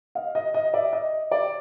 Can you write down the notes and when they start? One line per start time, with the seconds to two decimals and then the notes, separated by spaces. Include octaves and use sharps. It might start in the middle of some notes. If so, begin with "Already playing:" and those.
0.15 D#5 F5
0.35 D#5
0.54 D#5
0.73 D5 E5
0.93 D#5
1.31 D5